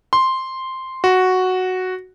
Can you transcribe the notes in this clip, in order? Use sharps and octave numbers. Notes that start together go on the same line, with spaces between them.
C6
F#4